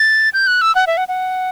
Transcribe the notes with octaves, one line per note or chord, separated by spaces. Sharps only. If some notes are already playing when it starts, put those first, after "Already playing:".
Already playing: A6
G6
F#6
E6
F#5
E5
F#5
F#5